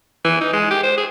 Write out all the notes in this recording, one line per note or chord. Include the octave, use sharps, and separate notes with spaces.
E3
D#4
G#3
G4
C5
G#4